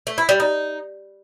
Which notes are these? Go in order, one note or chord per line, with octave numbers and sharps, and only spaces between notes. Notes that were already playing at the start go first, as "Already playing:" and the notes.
A3
E4
G3
D#4